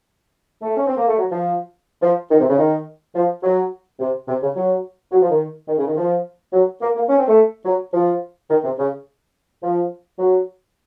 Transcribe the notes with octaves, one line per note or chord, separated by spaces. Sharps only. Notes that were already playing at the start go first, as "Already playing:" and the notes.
A3
C#4
C4
A#3
A3
F#3
F3
F3
D#3
C3
C#3
D#3
F3
F#3
C3
C3
C#3
F#3
F#3
F3
D#3
D#3
C#3
D#3
F3
F#3
A#3
A#3
C#4
C4
A3
F#3
F3
D#3
C3
C#3
F3
F#3